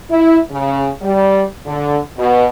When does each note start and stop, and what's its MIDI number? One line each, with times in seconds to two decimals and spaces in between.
0.10 0.38 64
0.51 0.87 49
1.02 1.43 55
1.66 1.98 50
2.18 2.45 47